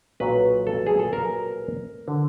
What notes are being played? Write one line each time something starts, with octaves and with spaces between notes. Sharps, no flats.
B1 A#2 F#3 B4
A4
G#4
A4
A#4
D3